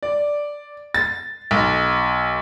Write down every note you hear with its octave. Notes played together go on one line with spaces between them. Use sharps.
D5
A6
B1